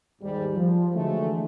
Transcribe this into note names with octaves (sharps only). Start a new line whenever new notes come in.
D#2 G#2 G3
F3
D3 E3 F#3 G#3 A3